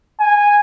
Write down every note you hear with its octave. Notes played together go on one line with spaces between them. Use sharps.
G#5